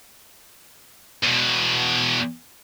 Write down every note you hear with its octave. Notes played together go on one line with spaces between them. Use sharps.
E2 B2